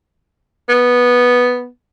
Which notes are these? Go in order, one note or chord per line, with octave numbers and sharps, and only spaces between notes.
B3